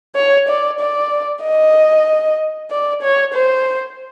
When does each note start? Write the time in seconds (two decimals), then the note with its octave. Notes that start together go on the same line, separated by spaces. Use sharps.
0.15 C#5
0.48 D5
0.80 D5
1.43 D#5
2.71 D5
3.02 C#5
3.34 C5